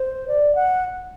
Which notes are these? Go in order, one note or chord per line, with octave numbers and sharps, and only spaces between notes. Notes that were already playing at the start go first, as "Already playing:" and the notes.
Already playing: C5
D5
F#5